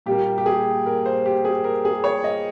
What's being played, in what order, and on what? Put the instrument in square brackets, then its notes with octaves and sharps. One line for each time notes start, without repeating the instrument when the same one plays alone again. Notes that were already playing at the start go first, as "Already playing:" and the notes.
[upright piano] A#2 G3 A#3 G4
G4
G#4
A#4
C5
G4
G#4
A#4
G#4
C#5
D#5